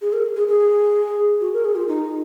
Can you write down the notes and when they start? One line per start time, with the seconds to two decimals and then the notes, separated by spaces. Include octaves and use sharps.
0.02 G#4
0.13 A#4
0.36 G#4
0.48 G#4
1.41 F#4
1.53 A#4
1.65 G#4
1.76 F4
1.88 D#4